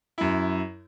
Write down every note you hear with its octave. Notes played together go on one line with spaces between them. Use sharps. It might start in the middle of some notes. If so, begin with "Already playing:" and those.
F#2 E4